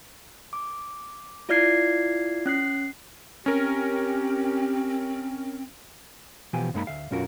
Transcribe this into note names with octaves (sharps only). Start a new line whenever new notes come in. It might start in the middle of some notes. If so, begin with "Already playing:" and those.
D6
E4 F4 D5 F6 G#6 C7
C#4 F#6 C7
C4 C#4 G4 A#4
B2 E3 F3 B3 G4 G#5
F#2 G#3 A#3 D#4 A#5 B5
D2 E5 F5
B1 F#2 C#4 F4 F#4 A#4